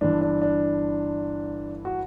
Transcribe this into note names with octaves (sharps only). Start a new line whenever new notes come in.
G1 G2 E3 D4
D4
D4
F#4